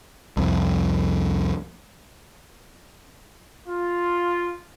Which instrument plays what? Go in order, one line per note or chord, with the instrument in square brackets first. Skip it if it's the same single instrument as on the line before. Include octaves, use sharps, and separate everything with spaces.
[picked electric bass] C2 F2
[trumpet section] F4